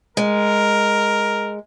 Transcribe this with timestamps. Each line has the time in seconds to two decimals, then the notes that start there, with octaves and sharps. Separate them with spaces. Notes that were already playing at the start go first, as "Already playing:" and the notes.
0.17 G#3 A#4